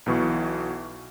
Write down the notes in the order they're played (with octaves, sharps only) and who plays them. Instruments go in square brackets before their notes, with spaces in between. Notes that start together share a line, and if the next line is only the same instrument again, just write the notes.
[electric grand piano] B1 B2 E3 C#6